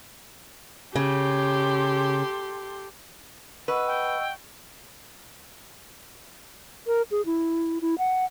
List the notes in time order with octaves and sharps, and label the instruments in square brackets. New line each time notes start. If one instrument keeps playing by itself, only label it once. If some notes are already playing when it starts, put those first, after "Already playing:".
[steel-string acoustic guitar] C#3 [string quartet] G4 A4 C6
[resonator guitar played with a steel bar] B4 [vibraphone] D#5 C#6 E6 [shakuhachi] F#5
[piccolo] G5
[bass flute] A#4
G#4
E4
E4
F#5